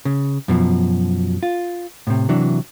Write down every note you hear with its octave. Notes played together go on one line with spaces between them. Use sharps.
C#3
F#2 B2 E3 F3
F4
A2 C3
C3 E3 F#3 D4